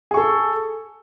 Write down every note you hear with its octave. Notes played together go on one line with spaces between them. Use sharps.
G#4 A4 C#6